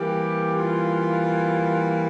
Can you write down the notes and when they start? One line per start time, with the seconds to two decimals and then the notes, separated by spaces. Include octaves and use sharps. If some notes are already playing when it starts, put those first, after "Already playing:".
Already playing: E3 G3 A#3 G4
0.55 F4